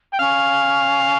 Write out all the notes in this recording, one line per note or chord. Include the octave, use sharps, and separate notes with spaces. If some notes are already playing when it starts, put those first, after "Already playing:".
G5
C#4 F5